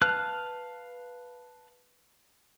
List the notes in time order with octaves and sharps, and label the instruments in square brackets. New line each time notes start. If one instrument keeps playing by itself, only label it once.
[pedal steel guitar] B4 F5 A5 F6 F#6